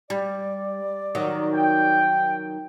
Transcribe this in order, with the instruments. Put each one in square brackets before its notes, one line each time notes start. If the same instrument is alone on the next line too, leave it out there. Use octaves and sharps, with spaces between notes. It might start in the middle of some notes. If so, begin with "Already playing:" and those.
[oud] G3 [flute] D5
[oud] D#3 F#3 F#4
[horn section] G5